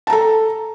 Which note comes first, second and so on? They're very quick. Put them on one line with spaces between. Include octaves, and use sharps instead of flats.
A5 A#5 A4